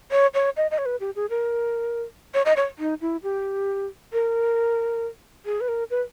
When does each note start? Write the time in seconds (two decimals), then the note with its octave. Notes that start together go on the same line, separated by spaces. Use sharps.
0.11 C#5
0.34 C#5
0.57 D#5
0.71 D#5
0.78 C#5
0.86 B4
1.00 G4
1.16 G#4
1.30 A#4
2.34 C#5
2.45 D#5
2.56 C#5
2.79 D#4
3.01 E4
3.23 G4
4.13 A#4
5.46 G#4
5.61 B4
5.68 A#4
5.90 B4